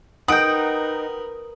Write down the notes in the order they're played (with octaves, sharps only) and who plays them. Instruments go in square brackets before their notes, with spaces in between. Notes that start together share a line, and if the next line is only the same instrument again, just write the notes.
[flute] D#4 [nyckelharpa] A#4 B4 [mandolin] F#5 G5 [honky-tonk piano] D#6 D7